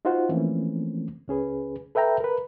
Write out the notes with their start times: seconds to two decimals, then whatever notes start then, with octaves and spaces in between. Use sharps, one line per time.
0.05 D#4 F4 F#4 C5 F#5
0.29 E3 F3 A3 A#3 C4 C#4
1.28 C#2 C#4 G#4 B4
1.95 A4 B4 E5 G5 A#5
2.20 A#4 B4